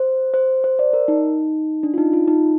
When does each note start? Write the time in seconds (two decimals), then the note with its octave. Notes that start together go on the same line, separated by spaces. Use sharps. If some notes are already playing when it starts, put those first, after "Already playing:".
Already playing: C5
0.34 C5
0.64 C5
0.79 D5
0.93 A#4
1.08 D#4
1.83 D4
1.94 F4
1.98 D#4
2.13 F4
2.28 D#4